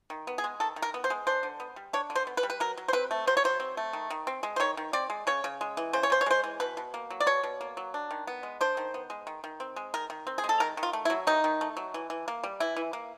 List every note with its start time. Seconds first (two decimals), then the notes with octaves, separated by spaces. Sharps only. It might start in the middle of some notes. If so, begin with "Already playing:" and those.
0.10 D#3
0.27 B3
0.38 G#4
0.44 G#3
0.60 D#3 A4
0.76 D#3
0.82 A#4
0.94 B3
1.04 C5
1.10 G#3
1.27 D4 C5
1.43 D3
1.60 B3
1.76 G3
1.93 D4 C#5
2.10 D3
2.15 C5
2.27 B3
2.37 B4
2.43 G3
2.50 B4
2.60 F#3 A#4
2.77 F#3
2.88 C5
2.93 C4 B4
3.11 A3
3.27 F#3 C5
3.37 C#5
3.44 F#3 C5
3.60 C4
3.77 A3
3.93 D#3
4.10 D#3
4.27 C4
4.43 G#3
4.56 C5
4.60 D#3 C#5
4.77 D#3
4.93 C4 D5
5.10 G#3
5.27 C#3 C#5
5.44 C#3
5.61 G#3
5.77 E3
5.93 C#3 C5
6.03 C#5
6.10 C#3 C5
6.21 C#5
6.26 G#3 C5
6.44 E3
6.60 B2 B4
6.77 B2
6.94 A#3
7.10 F#3
7.20 D5
7.26 B2 C#5
7.43 B2
7.61 A#3
7.77 F#3
7.94 D4
8.11 D#3
8.27 B3
8.43 G#3
8.61 D4 C5
8.77 D#3
8.94 B3
9.10 G#3
9.27 D#3
9.44 D#3
9.60 C4
9.76 G#3
9.94 D#3 A#4
10.10 D#3
10.27 C4
10.38 G#4
10.44 G#3
10.49 A4
10.60 D#3 A#4
10.77 D#3
10.83 F4
10.93 A3
11.05 E4
11.10 F#3
11.27 D#3 D#4
11.44 D#3
11.61 A3
11.77 F#3
11.94 E3
12.10 E3
12.28 A#3
12.43 G3
12.60 E3 E4
12.76 E3
12.93 A#3